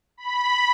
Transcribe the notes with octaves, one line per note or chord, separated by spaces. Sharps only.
B5